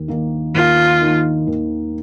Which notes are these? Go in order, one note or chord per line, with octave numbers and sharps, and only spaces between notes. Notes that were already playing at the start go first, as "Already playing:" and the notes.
Already playing: D#2
D#3 A#3 D#4
D#2 F4
D#3 A#3 D#4
D#2